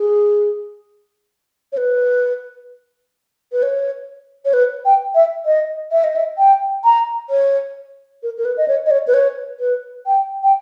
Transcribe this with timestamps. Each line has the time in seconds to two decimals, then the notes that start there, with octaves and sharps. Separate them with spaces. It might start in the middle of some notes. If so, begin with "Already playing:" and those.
Already playing: G#4
1.72 C#5
1.77 B4
3.52 B4
3.63 C#5
4.45 C#5
4.53 B4
4.85 G5
5.15 E5
5.46 D#5
5.92 E5
6.04 D#5
6.16 E5
6.38 G5
6.84 A#5
7.30 C#5
8.23 A#4
8.38 A#4
8.45 B4
8.57 D#5
8.68 C#5
8.86 D#5
8.91 C#5
9.07 B4
9.14 C#5
9.60 B4
10.07 G5
10.43 G5